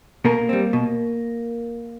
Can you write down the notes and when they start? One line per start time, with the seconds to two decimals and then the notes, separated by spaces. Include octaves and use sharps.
0.25 B2 A#3 A#4
0.49 G3 C4
0.73 B2